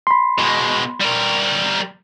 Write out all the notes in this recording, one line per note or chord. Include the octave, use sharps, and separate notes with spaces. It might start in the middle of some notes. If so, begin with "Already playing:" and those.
B5 C6
B2 G#3
G3 A#4